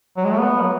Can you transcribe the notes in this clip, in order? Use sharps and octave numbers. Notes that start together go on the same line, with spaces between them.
F#3
G#3
A3
B3
F#3